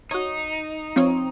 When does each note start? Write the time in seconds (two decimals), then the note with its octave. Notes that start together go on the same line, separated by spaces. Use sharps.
0.11 D#4 F#4 C#5
0.96 F3 C4 F4 C#5